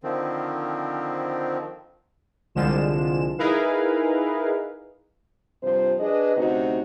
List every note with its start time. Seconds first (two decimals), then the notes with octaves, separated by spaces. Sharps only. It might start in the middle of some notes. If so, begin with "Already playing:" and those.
0.03 D3 D#3 F3 C4
2.55 C2 D3 F3 G#3 F4 E7
3.38 D#4 E4 G#4 A#4 B4 F5
5.62 G2 C3 F3 C5
6.00 D4 G#4 B4 D#5
6.37 D2 C3 C4 C#4 D#4 F#4